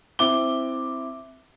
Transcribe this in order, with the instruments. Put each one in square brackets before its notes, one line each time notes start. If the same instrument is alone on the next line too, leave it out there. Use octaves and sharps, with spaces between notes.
[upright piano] C4 E4 D6 G7